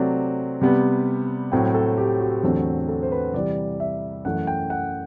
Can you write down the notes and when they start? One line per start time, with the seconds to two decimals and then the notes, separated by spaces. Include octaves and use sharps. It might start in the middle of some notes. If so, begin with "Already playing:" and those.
Already playing: C3 F#3 A3 C4 D5
0.61 C3 G3 B3
1.52 A2 F#3 C4 G5
1.74 A4
1.98 G4
2.20 F#4
2.43 E2 D3 F#3 A3 C4
2.89 A4
3.03 C5
3.12 B4
3.33 C3 E3 G3 D5
3.80 E5
4.25 F#2 E3 A3 F#5
4.47 G5
4.70 F#5